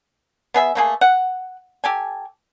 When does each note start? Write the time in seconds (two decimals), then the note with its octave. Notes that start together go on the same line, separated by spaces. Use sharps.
0.54 B3 G#4 E5
0.75 A3 A#3 G#4
1.01 F#5
1.84 G4 A4 G#5